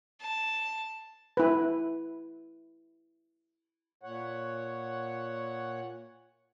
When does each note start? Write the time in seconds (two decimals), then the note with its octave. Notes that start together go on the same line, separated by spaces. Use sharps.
0.21 A5
1.37 E4 B4
4.03 A#2 C#5 F#5